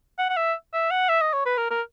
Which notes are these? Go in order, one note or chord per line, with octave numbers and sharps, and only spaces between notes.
F#5
F#5
E5
E5
F#5
E5
D#5
C#5
B4
A#4
A#4